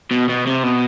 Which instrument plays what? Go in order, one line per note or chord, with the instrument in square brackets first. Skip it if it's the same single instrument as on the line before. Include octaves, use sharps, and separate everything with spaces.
[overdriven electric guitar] B2
B2
C3
B2